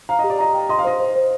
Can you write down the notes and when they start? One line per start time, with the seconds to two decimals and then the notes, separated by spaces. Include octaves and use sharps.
0.09 F5 A#5
0.19 G4 D#5
0.30 D5
0.39 D#5 A#5
0.54 G5
0.69 D#5 C6
0.79 F5
0.84 C5 D#5
0.99 C5
1.16 C5